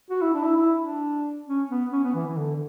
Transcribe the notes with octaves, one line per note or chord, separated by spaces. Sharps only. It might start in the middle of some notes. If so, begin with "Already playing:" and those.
F#4
E4
D4
E4
E4
D4
C#4
B3
C#4
B3
E3
E3
D3